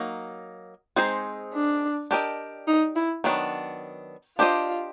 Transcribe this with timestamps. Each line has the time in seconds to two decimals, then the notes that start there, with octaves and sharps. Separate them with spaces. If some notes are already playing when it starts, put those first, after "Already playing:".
Already playing: F#3 A#3 D#4
0.96 G#3 C4 D#4 G#4 C5
1.54 D4
2.11 D4 G4 A#4 D#5
2.68 D#4
2.96 E4
3.24 D#3 F#3 B3 D4
4.39 D4 F4 G4 C5 D#5